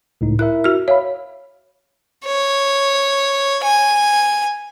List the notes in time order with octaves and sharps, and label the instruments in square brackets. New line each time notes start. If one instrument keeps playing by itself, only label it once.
[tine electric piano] C#2 A2 D#4
[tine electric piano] E4 A#4 E5 [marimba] F#6
[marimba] F#4 F6
[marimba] C#5 [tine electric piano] E5 F5 B5
[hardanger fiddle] C#5
G#5